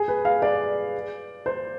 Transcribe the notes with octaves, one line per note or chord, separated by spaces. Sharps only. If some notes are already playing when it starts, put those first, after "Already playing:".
Already playing: G#4
B4
F5
D5
C5